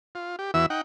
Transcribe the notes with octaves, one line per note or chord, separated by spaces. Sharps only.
F4
G4
E2 E3 F#4 E5 E6
D#4 F#5 G5